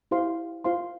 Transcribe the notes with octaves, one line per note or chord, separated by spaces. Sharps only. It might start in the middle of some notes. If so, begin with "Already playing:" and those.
E4 G4 C5 F5 C6
F4 C5 F5 C6